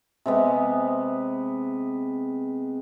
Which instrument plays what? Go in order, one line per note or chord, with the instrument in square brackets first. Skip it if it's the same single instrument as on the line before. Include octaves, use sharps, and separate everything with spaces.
[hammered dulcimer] C3 G#3 B3